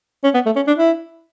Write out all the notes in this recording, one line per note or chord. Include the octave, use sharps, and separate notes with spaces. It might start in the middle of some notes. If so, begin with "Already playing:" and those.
C#4
B3
A3
C#4
D4
E4